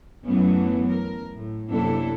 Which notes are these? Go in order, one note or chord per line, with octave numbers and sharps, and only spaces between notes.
F#2 E3 F#3 A3 B3 C#4
A#4
A2
F#2 C3 A#3 D4 E4 A4